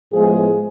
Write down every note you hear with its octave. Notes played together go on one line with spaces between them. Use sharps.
A2 F3 G#3 B3 G#4